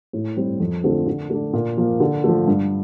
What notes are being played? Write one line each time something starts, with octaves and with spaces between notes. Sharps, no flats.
A2
G3 C4
F2
D3 F3 A3 C4
D3
A3 D4
A#2
F3 A#3
D3
F3 A3
G2